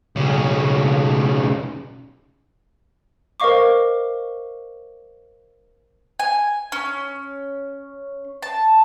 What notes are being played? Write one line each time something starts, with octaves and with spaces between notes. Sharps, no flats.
B1 C#3
A#4 C5 D#5 F5 C#6 D6
G#5
C#4
A5